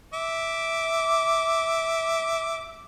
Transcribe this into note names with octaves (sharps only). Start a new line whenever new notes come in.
E5 D6